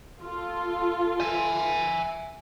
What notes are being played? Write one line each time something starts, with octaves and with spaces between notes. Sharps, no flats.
F4 A4
E5 G#5